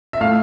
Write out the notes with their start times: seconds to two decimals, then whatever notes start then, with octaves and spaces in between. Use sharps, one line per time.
0.13 E5
0.21 A2 F5